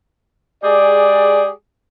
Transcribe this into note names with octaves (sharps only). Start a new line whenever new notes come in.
G#3 G4 G#4 D5